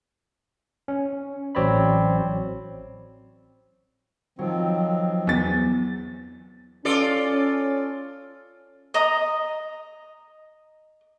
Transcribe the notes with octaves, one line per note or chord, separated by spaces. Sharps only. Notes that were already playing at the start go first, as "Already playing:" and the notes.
C#4
A1 F#3 C4 C#5 D5 B5
D#3 F3 F#3 C4
E2 A6
C#4 F4 A4 D5
D#5 A#5 D#6